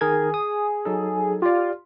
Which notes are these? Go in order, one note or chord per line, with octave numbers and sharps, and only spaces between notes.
D#3 G#4 A#4 G#6
D#6
F#3 D#4 A4
F4 G4 D5